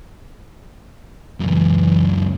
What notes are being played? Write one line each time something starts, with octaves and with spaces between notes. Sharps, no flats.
C#2 F#2 E3